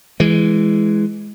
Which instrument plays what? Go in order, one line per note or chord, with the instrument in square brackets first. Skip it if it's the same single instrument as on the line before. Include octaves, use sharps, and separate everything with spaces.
[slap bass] E3 G#3